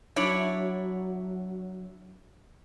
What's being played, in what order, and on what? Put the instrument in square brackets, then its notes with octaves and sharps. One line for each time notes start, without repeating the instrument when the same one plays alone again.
[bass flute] F#3 [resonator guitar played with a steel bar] D4 E4 C#5